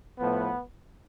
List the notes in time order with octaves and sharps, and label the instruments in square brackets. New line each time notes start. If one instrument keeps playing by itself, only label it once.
[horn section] A2 F3 B3